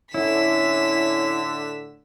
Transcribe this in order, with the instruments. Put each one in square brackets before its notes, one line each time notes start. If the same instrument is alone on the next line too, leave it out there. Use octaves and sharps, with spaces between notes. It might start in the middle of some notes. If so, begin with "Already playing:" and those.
[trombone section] A2 D3 [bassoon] C#4 [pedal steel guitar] E4 [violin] B6 E7